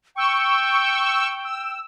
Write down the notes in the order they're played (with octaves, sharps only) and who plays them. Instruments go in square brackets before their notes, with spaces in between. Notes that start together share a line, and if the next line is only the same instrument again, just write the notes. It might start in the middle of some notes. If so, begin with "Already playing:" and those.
[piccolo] G5 [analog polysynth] C#6 E6
[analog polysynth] E6